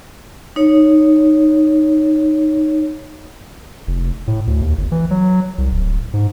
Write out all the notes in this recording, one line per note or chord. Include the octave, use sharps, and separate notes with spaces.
D#4 C#5
F1
A2
D2
D#2
G1
E3
F#3
C2
D1
G#2